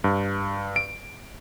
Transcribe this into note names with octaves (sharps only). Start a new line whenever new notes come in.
G2
D7